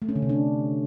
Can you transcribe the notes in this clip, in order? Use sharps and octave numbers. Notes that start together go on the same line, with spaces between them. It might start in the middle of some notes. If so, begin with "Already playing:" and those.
A3
C#4
D3
C3
D4